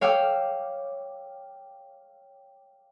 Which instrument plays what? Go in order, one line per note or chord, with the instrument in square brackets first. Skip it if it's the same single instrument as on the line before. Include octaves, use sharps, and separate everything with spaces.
[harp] C#5 F5 G5 D6 E6